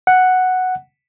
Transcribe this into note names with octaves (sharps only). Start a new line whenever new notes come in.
F#5